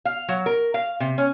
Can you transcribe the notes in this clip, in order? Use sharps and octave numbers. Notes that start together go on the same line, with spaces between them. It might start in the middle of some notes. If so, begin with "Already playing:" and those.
F5
F#3
A#4
F5
C3
C#4